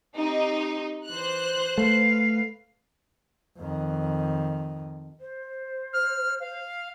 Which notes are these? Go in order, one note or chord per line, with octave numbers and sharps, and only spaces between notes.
C4 D#4 G4
E3 C5 F#6
A3 B4 F5
F2 D#3
C5
F6
F5